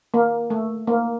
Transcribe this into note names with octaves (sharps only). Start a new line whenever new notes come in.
A#3
A3
A#3